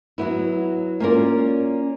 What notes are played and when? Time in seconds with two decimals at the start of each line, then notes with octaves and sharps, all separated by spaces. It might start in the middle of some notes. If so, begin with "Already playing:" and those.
0.18 F#3 B3 E4
1.00 A#3 C#4 F4 A#4 D5